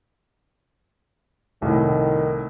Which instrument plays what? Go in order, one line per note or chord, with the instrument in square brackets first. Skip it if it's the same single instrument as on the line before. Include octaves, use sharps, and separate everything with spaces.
[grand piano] C2 A2 [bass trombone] D#3